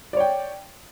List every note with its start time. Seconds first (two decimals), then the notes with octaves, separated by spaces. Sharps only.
0.13 D5
0.17 C#5
0.20 G5